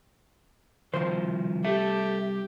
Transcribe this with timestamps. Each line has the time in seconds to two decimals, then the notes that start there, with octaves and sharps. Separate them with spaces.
0.94 C2 D#3 F3 C5
1.64 G4 A4 E5